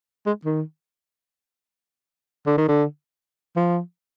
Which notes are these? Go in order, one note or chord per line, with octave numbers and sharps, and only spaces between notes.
G#3
D#3
D3
D#3
D3
F3